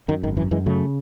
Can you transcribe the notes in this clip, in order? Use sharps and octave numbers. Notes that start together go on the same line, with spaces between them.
F#2 D#3
G#1 D#3
F#2 E3
F#2 E3 G#3
C#3 F#3 A3